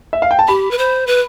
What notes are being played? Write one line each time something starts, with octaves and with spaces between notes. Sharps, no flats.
E5
F5
G5
A5
G4 B5
B4
C5
B4